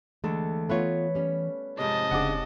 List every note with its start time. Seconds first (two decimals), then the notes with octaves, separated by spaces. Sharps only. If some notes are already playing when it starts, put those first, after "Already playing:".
0.24 D2 E3 G#3 A4
0.69 A3 B3 F4 B4 C#5
1.15 G3 C#4
1.79 F2 G#2 C3 D#5 A5
2.11 E1 C#3 D4 G#4 F#5 D6